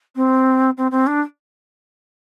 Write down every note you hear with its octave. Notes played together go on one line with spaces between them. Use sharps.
C4
C4
C4
D4